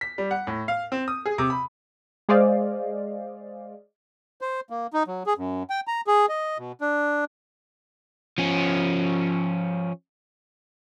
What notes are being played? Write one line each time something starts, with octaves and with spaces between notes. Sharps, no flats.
B6
G3
F#5
A2
F5
C4
D#6
G#4
C3
B5
G#3 G#4 C5 D5 D#5 F5
C5
A#3
D#4
F#3
G#4
F#2
G5
A#5
G#4
D#5
B2
D4
F3 C#4